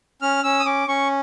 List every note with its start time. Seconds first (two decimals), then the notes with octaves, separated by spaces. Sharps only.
0.22 C#4 F6
0.44 C#4 E6
0.60 D#6
0.65 C#4 D6
0.88 C#4 C#6